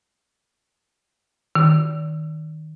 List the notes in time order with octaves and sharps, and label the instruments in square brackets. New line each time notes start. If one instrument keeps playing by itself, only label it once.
[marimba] D#3